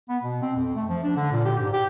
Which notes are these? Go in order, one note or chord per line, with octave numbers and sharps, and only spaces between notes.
B3
B2
C4
F2
A3
F3
D4
D3
A#2
G4
G#2
G4